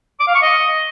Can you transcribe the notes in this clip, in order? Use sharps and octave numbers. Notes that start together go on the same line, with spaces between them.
D6
F5
C#6
D#5